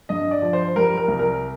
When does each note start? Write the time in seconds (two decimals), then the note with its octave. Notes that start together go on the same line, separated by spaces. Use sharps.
0.09 G2 D#5
0.31 D5
0.42 F3
0.53 C5
0.76 G3 A#4
0.97 A#4
1.08 C2
1.19 A#4